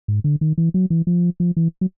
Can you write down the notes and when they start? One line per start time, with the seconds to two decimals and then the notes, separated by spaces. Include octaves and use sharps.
0.08 G#2
0.24 D3
0.41 D#3
0.58 E3
0.74 F#3
0.90 E3
1.07 F3
1.40 F3
1.57 E3
1.81 F#3